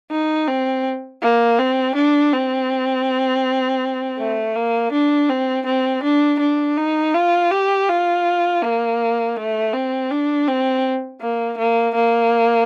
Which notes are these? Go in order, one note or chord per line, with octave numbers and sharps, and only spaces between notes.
D#4
C4
A#3
C4
D4
C4
A3
A#3
D4
C4
C4
D4
D4
D#4
F4
G4
F4
A#3
A3
C4
D4
C4
A#3
A#3
A#3